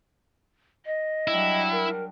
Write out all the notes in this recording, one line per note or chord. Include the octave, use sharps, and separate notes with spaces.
D#5
F#3 G3 D4 E4
A#4